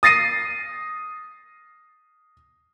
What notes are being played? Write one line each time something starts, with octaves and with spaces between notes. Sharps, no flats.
D#6 A6 A#6 C7 D#7